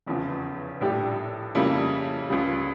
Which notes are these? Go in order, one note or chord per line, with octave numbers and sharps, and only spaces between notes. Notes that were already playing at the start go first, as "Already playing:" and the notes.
F1 E2 C#3 F3
A#1 A2 G3 D4 G4
F2 C#3 G3 A#3 E4
C#2 C#3 G3